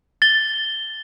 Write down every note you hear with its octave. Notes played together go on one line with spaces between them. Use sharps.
A6 G7